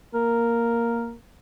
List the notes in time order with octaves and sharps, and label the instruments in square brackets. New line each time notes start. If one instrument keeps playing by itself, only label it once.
[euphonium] A#3 [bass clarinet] A#4